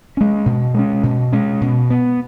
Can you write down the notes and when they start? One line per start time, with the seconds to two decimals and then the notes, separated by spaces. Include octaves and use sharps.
0.17 G#3 C#4
0.46 B2
0.74 G#3 C#4
1.03 B2
1.32 G#3 C#4
1.61 B2
1.90 B3